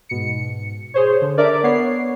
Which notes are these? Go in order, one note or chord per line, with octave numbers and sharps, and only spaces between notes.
G#2 B2 C#7
G#4 C5 C#5
D3
D4 A#4 D5 E5 D6
B3 C#5 C7